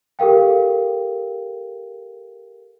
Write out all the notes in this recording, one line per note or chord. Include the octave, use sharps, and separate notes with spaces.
G4 A4 A#4 F5 G5